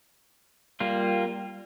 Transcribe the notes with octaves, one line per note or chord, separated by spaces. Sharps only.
G3 A#3 F4